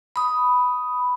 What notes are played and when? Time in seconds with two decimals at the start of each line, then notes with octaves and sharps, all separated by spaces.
0.16 B5 D#6